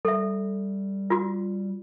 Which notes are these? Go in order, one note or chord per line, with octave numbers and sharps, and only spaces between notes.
G3 A4 E5
F4 F#4